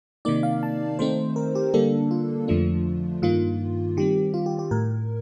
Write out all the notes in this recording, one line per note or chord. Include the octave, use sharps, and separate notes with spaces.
C3 D#3 A#3 D#4 D5
F5
A5
D#3 A3 C4 D#4 C5
A#4
G4
D3 G3 A#3 D4 A4
F4
F2 D3 F3 A3 D4
G2 D#3 A#3 F4
D#3 G3 C4 G4
F4
G4
G4
A2 A#4